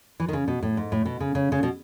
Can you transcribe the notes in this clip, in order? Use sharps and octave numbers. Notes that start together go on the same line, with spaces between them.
E3
D#3
C#3
B2
A2
G#2
A2
B2
C#3
C#3
C#3
B2